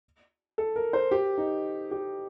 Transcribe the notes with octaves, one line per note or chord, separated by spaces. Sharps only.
A4
A#4
C5
G4
D#4
G4